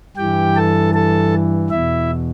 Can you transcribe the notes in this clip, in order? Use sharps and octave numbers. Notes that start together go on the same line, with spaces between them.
G2 E3 G4 G5
A4 A5
A4 A5
E2 B2 E4 E5